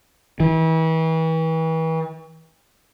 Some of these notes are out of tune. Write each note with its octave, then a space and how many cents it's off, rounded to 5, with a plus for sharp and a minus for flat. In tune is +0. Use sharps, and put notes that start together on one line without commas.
E3 -35